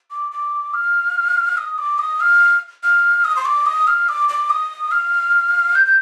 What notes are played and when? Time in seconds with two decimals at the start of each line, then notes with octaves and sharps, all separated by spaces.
0.11 D6
0.32 D6
0.74 F6
1.57 D#6
1.78 D6
1.98 D#6
2.20 F6
2.83 F6
3.25 D#6
3.36 C6
3.45 D6
3.66 D#6
3.87 F6
4.09 D6
4.29 D6
4.50 D#6
4.91 F6
5.75 G6
5.86 G6